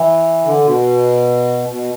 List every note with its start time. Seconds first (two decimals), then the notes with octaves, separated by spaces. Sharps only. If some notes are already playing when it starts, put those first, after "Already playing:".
Already playing: E3
0.45 D3
0.66 B2
1.69 B2